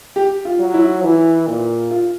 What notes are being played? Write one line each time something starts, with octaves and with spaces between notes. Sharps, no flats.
G4
F4
F#3
E4
E3 E4
A#2
F4